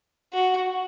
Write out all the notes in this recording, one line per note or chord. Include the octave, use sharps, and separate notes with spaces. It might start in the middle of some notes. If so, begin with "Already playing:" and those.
F#4